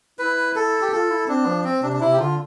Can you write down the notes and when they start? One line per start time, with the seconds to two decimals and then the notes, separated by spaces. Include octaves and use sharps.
0.19 E4 B4
0.56 A4
0.81 G4
0.92 F4 A4
1.10 E4
1.28 C4 D4
1.46 F3
1.64 C4
1.83 C3 D4
1.93 D4
2.01 C3 E4
2.13 G4
2.19 D3 F4